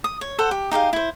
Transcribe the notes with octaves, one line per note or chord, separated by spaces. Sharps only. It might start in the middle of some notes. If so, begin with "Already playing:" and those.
D#6
C#5
A4 C5 F#5
G4
D#4 G4 G#4 F5
E4 C5